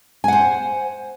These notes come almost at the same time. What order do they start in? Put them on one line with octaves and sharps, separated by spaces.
G#5 F#5 C5